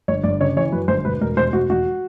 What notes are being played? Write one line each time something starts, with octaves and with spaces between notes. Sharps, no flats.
G1 C#5
G1 D5
C#3 C#5
E3 C#5
F#2 B4
G1 C5
E1 B4
E1 A#4
E1 C5
E1 F#4
E1 F#4